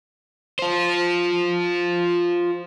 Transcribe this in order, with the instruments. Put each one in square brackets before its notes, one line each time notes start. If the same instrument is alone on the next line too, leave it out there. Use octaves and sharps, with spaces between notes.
[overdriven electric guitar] F4 C5